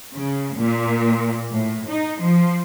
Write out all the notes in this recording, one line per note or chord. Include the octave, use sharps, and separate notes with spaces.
C#3
A#2
A2
D#4
F3